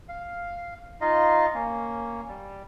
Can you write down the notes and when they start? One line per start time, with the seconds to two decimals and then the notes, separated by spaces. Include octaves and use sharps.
0.09 F5
1.01 D#4 F4 D#5 F5
1.54 A#3 C#4
2.28 G3